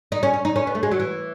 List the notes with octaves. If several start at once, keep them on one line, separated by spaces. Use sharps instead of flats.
D#4
C#4
C#4
D#4
C#4
B3
A3
G#3
F#3
E3